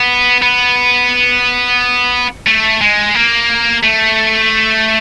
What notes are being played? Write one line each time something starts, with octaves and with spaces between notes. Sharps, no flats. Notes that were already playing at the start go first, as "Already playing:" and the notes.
Already playing: B3
B3
A3
G#3
A#3
A3